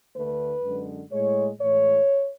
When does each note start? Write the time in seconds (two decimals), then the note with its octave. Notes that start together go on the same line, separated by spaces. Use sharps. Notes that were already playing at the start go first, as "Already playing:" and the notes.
0.15 D2 D3 A3 B4
0.63 F#2 D3 G#3
1.12 A2 G#3 C#5
1.61 A2 E3 G#3 C#5